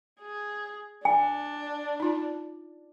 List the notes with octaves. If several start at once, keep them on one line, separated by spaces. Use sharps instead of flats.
G#4
D4 G#5
D#4 F4